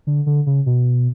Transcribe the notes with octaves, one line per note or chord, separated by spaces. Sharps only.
D3
D3
C#3
B2